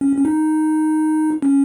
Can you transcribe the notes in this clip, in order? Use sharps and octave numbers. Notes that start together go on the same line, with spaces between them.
C#4
C#4
D#4
C#4